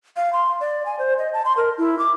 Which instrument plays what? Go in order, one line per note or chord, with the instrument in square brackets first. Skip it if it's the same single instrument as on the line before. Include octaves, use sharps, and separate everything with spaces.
[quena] F5
C6
D5
G#5
C5
D#5
A5
C6
A#4
E4
D6